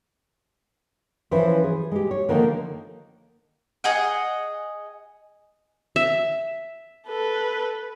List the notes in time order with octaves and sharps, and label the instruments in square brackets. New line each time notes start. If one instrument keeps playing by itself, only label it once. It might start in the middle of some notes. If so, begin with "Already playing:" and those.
[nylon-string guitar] E3 F3 C#4 E4 C5
G#4
G#3 G4
C#5
D3 D#3 F3 A#3 D#4
[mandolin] G#4 D#5 F#5
[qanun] E5
[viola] A4 B4